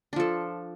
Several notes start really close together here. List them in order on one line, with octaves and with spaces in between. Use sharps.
D4 F3 A4